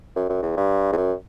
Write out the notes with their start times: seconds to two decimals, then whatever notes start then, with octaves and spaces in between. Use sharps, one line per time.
0.16 F#2
0.30 F#2
0.43 E2
0.57 G2
0.92 E2
0.97 F#2